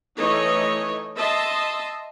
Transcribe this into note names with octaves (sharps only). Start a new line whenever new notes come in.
E3 A3 D#4 C#5 D#5
D#5 E5 A5 C6